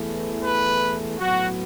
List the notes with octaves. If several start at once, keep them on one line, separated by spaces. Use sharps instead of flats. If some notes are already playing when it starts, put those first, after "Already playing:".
Already playing: E2 E3 A3
B4
A2 F#3 B3 F#4